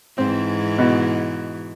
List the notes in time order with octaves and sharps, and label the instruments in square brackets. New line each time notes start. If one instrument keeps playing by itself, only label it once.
[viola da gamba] G#2 E3 [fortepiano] C4
[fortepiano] B2